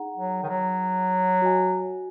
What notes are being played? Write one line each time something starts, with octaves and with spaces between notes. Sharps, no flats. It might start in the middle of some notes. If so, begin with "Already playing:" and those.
Already playing: D#4 G#4 F#5 A#5
F#3
D#3
F#3
F#4 D#5 G#5